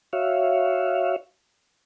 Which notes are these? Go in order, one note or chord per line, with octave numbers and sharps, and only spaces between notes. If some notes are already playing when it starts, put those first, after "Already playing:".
F#4 C#5 E5 F5